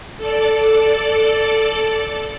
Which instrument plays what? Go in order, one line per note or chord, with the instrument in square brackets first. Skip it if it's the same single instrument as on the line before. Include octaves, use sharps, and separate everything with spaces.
[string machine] A4 D5